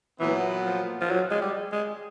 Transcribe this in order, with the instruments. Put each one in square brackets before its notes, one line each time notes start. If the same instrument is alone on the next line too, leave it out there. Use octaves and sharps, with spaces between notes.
[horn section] A#2 F#3 B3 [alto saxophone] E3
[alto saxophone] F3
F3
F#3
G#3
G3
G#3